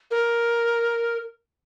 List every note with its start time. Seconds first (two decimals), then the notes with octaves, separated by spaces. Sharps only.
0.11 A#4